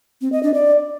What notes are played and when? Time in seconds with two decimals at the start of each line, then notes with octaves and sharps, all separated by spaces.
0.21 C4
0.32 D#5
0.43 D4
0.54 D5